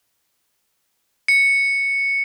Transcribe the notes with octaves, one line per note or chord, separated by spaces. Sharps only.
C#7